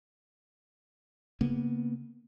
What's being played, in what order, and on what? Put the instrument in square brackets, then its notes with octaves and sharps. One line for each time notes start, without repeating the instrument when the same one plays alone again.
[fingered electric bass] C#3 A#3 B3